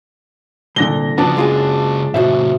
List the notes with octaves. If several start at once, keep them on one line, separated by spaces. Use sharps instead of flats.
C2 A#2 D3 A#6 G7
C#3 F3 B3 D4 F#4
G#3 F4 G#4
B2 D3 F#4 C5 E5